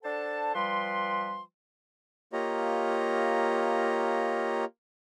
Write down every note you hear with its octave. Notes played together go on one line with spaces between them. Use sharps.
D4 A4 C5 F#5 A5
F3 G3 B4 G5 C6
A#3 F4 G4 C#5 D#5 A#5